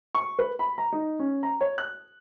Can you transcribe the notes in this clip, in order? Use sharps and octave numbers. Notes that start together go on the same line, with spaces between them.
C#6
B4
B5
A#5
D#4
C#4
A#5
C#5
F#6